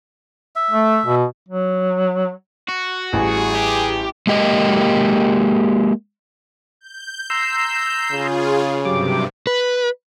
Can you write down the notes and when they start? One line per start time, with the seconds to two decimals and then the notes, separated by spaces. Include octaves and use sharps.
0.56 E5
0.71 A3
1.06 B2
1.49 F#3
2.69 F#4
3.13 A1 G3 G#4 G#5
3.56 G4
4.27 G#3 A#3 G4 D#5
6.81 G6
7.30 A#5 C6 E6
8.11 C#3 F4 G#4
8.85 G2 C3 F#3 G4 D6
9.47 B4